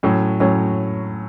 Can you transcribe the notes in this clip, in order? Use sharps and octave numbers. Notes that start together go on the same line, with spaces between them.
A2 F#3 C#4
A2 F#3 C#4